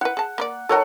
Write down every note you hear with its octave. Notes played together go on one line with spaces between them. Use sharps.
E4 B4 F#5
G#4 A5
A#3 B4 D5
G3 D#4 A4 A#4 C#5 F#5